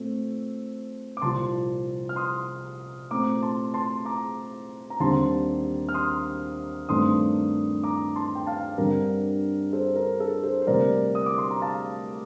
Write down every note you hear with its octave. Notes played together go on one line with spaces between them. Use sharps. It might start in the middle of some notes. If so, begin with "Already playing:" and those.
Already playing: A#2 A3 C4
D6
C2 A#2 F3 A5 C6
F6
C6 D#6
A#2 A3 C4 A#5 D6
A5 C6
A5 C6
A#5 D6
A#5
D#2 D3 G3 C4 A5 C6
F6
C6 D#6
G2 D#3 A3 C4 C6 D#6
A#5 D6
A5 C6
G5
F5 A5
G2 D3 G3 C4 A#4
A4 C5
A#4
A4
A4 C5
C5
D2 C3 G3 A#3 A#4 D5
D#6
D6
C6
A#5
F5 A5